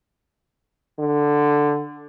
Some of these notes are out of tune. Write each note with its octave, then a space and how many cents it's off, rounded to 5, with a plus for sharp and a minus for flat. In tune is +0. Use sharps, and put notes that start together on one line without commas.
D3 +0